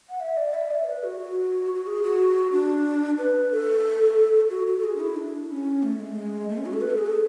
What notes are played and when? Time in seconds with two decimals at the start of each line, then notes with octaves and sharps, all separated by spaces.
0.09 F#5
0.20 E5
0.37 D5
0.54 E5
0.71 D5
0.83 C#5
0.87 B4
1.04 F#4
1.20 F#4
1.74 F#4
1.87 G#4
2.03 F#4
2.52 D4
3.18 B4
3.52 A4
4.50 F#4
4.67 F#4
4.78 A4
4.84 G#4
4.96 D4
5.00 E4
5.16 D4
5.50 C#4
5.83 A3
6.00 G#3
6.12 A3
6.16 G#3
6.49 A3
6.57 C#4
6.66 F#4
6.73 A4
6.81 B4
6.90 A4
6.98 G#4
7.06 A4